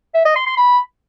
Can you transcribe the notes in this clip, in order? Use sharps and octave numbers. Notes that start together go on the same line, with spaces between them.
E5
D#5
C6
C6
B5